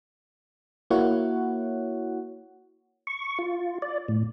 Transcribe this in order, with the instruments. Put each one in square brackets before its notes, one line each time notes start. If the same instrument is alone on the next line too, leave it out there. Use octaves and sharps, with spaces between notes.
[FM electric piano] A#3 E4 F#4 C#5 F#5
[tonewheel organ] C#6
F4
D5
A2